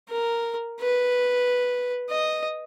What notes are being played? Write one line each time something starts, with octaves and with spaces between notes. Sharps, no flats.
A#4
B4
D#5